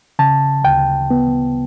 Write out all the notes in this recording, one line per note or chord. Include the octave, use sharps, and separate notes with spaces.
C#3 A5
D2 G5
B3